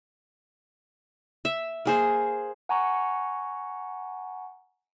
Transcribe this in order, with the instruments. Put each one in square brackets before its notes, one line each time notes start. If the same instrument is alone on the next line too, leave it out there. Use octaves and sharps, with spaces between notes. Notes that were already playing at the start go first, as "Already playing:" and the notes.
[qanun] E5
A#3 G#4 C5
[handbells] F#5 G#5 A#5 C#6